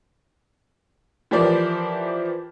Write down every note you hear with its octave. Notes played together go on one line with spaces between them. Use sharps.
E3 F3 G4 A#4 C5 D5